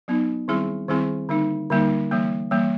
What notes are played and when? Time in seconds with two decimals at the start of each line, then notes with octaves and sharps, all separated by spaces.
0.08 F#3 B3 D#4
0.48 D#3 G3 C4 E4 G#4
0.88 D#3 G3 C4 E4 G#4
1.29 D3 G3 A#3 D#4
1.70 D3 G3 A#3 D#4
2.11 E3 G3 A#3
2.51 E3 G3 A#3